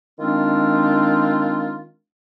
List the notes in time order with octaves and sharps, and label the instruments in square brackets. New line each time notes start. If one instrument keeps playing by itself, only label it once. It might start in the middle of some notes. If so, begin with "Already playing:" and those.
[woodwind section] D#3 G#3 C4 D4 F4